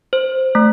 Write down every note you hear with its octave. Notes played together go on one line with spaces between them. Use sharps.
C5
A3